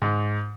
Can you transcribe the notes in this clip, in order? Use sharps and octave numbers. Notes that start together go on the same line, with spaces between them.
G#2